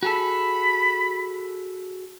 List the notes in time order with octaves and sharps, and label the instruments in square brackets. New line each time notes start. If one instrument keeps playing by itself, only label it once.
[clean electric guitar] F#4 G#4 A4 [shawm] B5